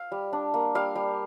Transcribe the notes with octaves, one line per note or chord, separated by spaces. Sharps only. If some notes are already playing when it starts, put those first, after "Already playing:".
Already playing: F5
G3
D4
A#3
G3 F5
G3